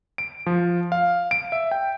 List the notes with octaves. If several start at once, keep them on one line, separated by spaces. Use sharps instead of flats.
D7
F3
F5
D7
E5
G5